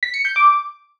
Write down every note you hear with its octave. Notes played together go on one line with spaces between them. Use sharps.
B6
C#7
G6
D6